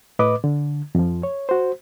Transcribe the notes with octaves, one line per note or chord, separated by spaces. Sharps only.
A2 B4 D#5 D6
D3
F2 F3
C#5
F#4 C5